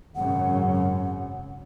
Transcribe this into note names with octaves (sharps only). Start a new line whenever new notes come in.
G#1 F#2 C#3 F#5